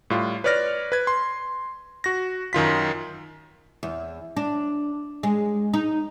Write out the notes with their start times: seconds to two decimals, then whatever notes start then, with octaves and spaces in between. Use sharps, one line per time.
0.10 A2 G3 F4
0.44 B4 C#5 D5 F6 A#6
0.92 B4 G#6
1.07 C6
2.04 F#4 A#6
2.53 F#2 D#3 F4 B6
3.83 E2
4.37 D4
5.23 G#3
5.74 D#4